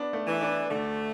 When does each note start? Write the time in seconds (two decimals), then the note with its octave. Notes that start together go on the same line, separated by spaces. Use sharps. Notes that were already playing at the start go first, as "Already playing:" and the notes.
Already playing: B3 D4
0.13 A3
0.27 E3
0.41 D4
0.71 D2 A3